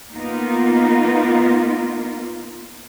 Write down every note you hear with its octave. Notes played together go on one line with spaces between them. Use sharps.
A#3 B3 D#4 F4 A#4